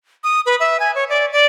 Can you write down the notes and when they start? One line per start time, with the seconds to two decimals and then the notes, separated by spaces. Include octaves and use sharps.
0.24 D#6
0.46 B4
0.60 E5
0.80 G#5
0.95 C#5
1.09 D5
1.32 D5